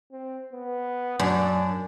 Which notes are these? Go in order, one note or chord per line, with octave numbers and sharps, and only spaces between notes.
C4
B3
F#2 D4